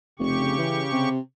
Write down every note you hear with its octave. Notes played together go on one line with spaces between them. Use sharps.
F1 C#3 G4 C#6
E3
C3